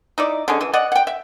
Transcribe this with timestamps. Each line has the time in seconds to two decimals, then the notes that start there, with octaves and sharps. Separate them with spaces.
0.18 D#4 E4 D5
0.48 D3 G#3 C#4
0.61 E3
0.73 D5 D#5 F#5
0.92 F#5 G5
1.07 E5